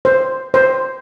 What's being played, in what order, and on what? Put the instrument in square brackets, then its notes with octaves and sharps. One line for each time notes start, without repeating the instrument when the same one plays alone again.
[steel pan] C5
C5